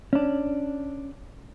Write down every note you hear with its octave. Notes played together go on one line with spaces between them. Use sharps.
C#4 D4